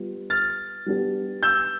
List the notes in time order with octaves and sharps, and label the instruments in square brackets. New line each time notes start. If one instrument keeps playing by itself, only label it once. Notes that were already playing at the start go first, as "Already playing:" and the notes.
Already playing: [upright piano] G3 B3 F4
[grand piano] F6 A6
[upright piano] G3 B3 D4 G4
[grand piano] E6 G6